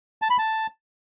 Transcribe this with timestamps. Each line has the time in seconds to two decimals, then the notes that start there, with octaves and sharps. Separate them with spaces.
0.22 A5
0.30 B5
0.38 A5